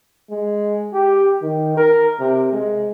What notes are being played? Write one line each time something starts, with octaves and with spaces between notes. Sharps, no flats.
G#3
G4
D#3
A#4
C3
G#3